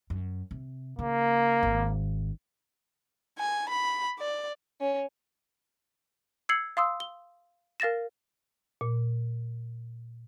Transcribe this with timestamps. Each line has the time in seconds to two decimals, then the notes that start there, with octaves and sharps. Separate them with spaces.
0.10 F#2
0.51 C3
0.99 C#3 A#3
1.63 G#1
3.38 G#5
3.69 B5
4.19 D5
4.81 C#4
6.49 E6 G#6 C7 C#7 F#7
6.77 F5 C6 D#6 E6
7.00 G7
7.80 A#4 F5 A6 A#6 E7
8.81 A#2